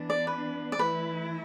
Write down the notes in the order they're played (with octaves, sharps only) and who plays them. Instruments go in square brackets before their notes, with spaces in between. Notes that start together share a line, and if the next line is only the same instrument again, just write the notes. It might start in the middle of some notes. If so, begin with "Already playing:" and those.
Already playing: [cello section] E3 B3 D4
[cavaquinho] D5
B4
D5
[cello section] E3 A3 E4 [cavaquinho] B4